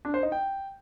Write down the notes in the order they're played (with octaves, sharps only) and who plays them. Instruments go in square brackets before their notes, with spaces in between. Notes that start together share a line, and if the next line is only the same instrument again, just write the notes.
[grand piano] D4
C5
D#4
G5